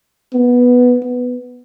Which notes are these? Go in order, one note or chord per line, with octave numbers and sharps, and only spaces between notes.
B3
B3